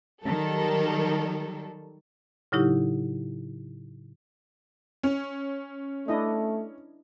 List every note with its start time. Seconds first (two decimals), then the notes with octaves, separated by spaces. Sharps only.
0.23 D#3 F#3 G3 A4 A#4
2.52 A2 C#3 F#3 D#4 E4 G4
5.03 C#4
6.08 A3 D4 E4 D#5